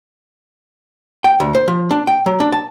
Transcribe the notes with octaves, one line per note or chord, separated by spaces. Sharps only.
G5
D2
C5
F3
D4
G5
F#3
D4
A5